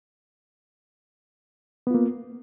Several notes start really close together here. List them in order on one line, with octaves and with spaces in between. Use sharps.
B3 F4 A#3